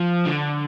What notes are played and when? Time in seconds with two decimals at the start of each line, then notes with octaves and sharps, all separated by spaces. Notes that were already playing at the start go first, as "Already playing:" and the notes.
Already playing: F3
0.26 D3